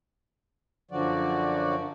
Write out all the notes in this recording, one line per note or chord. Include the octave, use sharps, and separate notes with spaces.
F#2 D3 F3 F#3 F#4 D5